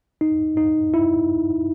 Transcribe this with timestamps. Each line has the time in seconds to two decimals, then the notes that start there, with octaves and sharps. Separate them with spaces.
0.21 D#4
0.57 D#4
0.94 E4